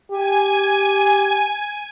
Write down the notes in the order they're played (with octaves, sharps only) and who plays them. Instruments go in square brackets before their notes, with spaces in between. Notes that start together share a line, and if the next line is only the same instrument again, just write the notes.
[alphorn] G4 [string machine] G#5